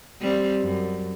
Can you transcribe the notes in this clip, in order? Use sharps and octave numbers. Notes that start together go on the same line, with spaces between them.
G3 C4
F#2